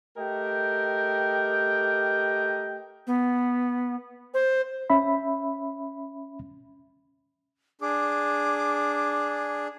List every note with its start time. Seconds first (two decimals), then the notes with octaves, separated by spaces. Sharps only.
0.16 A3 G4 A#4 D#5 G5
3.07 B3
4.34 C5
4.90 C#4 E5 B5
7.81 D4 G#4 D6